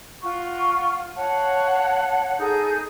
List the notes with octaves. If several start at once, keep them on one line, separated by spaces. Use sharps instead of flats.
F4 F#5 C#6
C#5 F5 F#5 A5
D#4 G#4 A4 G6